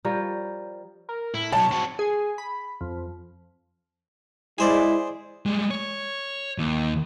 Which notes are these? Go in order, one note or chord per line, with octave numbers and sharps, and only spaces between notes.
F3 G3 A#4 C#5
A#4
A2 E4
B1 F#3 C#5 A5
C4 F#4
G#4
B5
F2
G#3 E4 G#4 C5 D5
G3 G#3
C#5
D#2